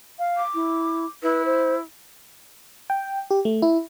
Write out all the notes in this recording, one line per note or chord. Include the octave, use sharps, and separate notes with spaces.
F5
D6
E4
E4 B4
C5
G5
G4
A3
E4